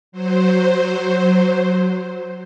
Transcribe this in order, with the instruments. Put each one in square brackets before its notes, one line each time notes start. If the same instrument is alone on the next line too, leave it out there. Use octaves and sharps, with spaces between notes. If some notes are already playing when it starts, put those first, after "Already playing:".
[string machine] F#3 C5